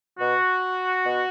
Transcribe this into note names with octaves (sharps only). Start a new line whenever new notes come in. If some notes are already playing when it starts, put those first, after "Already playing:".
B2 F#4
B2